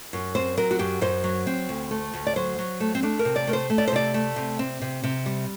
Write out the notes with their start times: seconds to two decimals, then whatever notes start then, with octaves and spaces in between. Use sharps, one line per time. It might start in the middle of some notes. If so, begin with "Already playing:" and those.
0.13 F#2
0.35 C4 C5
0.57 F#3 A#4
0.71 F#4
0.79 F#2 G4
1.01 F#2 C5
1.24 F#3
1.47 C4
1.69 D2
1.91 A3
2.13 D2
2.27 D5
2.36 F#3 C5
2.58 F#3
2.80 A3
2.95 C4
3.03 A3 D4
3.19 A#4
3.25 C3
3.36 D5
3.47 A3 A#4
3.53 C5
3.70 A3
3.78 D5
3.88 C5
3.92 C3 D5
4.14 A3
4.36 C3
4.59 C4
4.81 C3
5.04 C3
5.26 G3